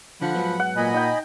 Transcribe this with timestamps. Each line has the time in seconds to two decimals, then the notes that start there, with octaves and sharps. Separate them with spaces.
0.21 D3 F3 F#5 B5
0.35 G#2 F#3 B3
0.60 F#5
0.76 A#2 D#5 G#5 B5
0.94 D#4 G5